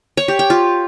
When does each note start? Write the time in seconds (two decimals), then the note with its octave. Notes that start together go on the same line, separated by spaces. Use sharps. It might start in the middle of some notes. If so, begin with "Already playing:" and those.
0.17 C#5
0.28 G4
0.39 G5
0.50 F4